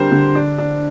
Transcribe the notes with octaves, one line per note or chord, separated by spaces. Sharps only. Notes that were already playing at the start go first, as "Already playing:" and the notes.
Already playing: D3 G3 C4 A#4 C5
D3
D4
D4